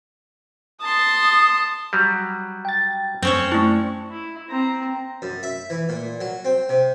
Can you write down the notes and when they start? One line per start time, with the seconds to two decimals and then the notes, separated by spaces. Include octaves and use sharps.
0.82 A5 C6 D#6
1.93 F#3 G3
2.65 G5 A6
3.23 F#2 C4 C#4 C#5 E7
3.52 A3 E4 C#6
4.10 E4
4.49 C4 A#5
5.22 F#2
5.43 E5
5.70 E3
5.89 A#2
6.21 F#3
6.45 C4
6.69 C3